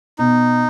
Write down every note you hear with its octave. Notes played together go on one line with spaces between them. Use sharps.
B2 D#4